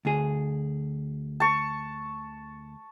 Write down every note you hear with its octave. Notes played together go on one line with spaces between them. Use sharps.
D2 G#4
A5 C#6